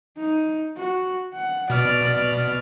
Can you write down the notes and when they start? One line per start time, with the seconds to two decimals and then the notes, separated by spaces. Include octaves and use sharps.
0.17 D#4
0.77 F#4
1.34 F#5
1.70 B2 D5 F6